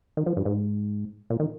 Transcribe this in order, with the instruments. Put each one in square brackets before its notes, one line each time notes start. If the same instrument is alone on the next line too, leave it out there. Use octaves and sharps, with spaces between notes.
[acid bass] D#3
F3
G2
G#2
A#2
D#3